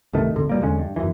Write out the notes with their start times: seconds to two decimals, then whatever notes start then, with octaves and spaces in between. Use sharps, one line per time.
0.13 C2 G2 D#3 A3
0.34 D1 G#1 D3
0.49 B2 G3 A#3
0.61 E2 D3 G#3 C#4
0.79 G2
0.96 G1 C2 F#2 E3